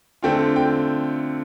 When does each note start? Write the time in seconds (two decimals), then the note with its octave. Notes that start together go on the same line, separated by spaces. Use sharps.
0.23 D3 A3 C4 F4 G5
0.56 G5